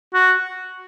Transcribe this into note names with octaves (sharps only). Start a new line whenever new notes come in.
F#4